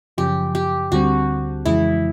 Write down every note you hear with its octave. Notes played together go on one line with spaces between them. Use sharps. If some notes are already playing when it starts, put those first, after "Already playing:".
F#2 C#3 F3 G4
G4
D2 D3 G3 C4 F#4
F2 C#3 E3 G#3 E4